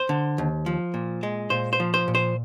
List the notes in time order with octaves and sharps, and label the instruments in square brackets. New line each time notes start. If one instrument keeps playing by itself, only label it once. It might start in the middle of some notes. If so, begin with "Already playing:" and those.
Already playing: [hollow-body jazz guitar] C5
D3
D#2
F3
A#2
G#3
A#2 C5
C5
F3
C5
A#2
C5